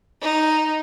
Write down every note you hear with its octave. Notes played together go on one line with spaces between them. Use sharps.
D#4